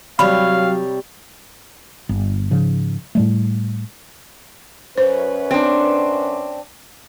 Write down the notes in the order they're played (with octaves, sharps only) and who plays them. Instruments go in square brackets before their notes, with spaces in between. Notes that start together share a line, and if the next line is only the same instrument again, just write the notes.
[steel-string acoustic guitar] C3 G3 C#5 [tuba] F#3 [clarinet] F5 [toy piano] B5
[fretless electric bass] G1
G#2 C#3 F3
A2 G3 A3
[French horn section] F#2 C#4 B4 [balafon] C5
[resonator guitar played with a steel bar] C4 D4